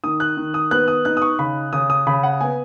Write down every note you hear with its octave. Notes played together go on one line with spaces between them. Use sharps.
D#3 D#6
F#6
D#3
D#6
B3 F#6
D#6
D#4 F#6
D#6
C#6
C#3 B5
C#3 D#6
D#6
C#3 B5
F#5
B3 G#5